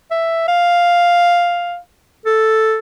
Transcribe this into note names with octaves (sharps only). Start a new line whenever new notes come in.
E5
F5
A4